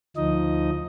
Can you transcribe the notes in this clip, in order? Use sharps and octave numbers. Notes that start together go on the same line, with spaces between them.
D2 F3 D#4 D#5